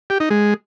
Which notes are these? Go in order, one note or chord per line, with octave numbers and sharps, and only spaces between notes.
G4
D#4
G#3